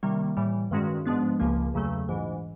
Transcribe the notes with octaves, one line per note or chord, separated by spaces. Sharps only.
C3 D#3 G3 A#3
A2 E3 G3
G2 D#3 G#3 C#4 F#4
G#2 F3 G#3 B3 D4
C#2 C#3 F3 A#3
E2 C#3 F#3 A3
A#1 G#2 E3